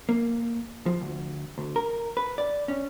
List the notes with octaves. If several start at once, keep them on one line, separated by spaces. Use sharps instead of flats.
A#3
F3
D2
D2
A#4
B4
D5
C#4